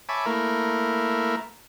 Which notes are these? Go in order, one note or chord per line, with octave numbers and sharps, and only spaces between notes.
C#5 E5 G#5 A5 B5 D6
A3 A#3 E4 A#4